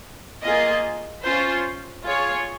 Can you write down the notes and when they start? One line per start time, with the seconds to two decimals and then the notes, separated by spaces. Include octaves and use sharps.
0.42 A#3 F4 G#4 D#5
1.23 C#4 F4 C5
2.03 F4 G#4 C#5